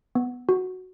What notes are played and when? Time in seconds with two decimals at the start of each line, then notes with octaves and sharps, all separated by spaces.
0.15 B3
0.49 F#4